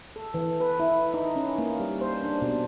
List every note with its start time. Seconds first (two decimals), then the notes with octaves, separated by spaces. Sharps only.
0.16 A4
0.34 E3
0.60 B4
0.80 E4
1.14 D#4
1.36 C#4
1.58 A#3
1.80 G3
2.01 C5
2.23 D4
2.42 B2